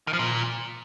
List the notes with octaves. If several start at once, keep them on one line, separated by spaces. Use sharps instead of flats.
D#3
F3
A#2